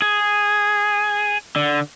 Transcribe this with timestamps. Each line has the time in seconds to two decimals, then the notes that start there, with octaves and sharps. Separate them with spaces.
0.02 G#4
1.56 D3